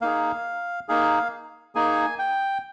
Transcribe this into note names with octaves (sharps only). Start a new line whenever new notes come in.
A#3 D#4 G#4 F5
A#3 D#4 G#4 F5
A#3 D#4 G#4 G#5
G5